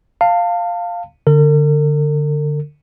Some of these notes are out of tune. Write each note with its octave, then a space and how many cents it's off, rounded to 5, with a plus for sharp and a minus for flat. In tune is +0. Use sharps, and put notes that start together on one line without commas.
F5 +0 A5 +30
D3 +0 A#4 -45